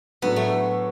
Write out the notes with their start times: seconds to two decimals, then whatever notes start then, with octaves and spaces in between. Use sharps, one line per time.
0.22 A2 F#3 B3 D4 F#4
0.36 A3